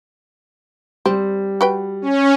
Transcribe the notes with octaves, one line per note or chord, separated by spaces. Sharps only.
G3 C4
F#4 B4 G5
C#4